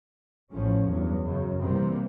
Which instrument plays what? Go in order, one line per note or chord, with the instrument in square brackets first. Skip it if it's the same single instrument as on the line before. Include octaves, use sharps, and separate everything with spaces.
[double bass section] A1 A2 F3 C#4
E2 G2 F#3
F#2 C#3
C3 E3 G3 A#3 C4